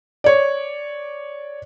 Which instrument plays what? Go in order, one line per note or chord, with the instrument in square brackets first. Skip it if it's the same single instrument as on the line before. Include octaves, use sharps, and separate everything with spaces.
[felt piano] C#5 D5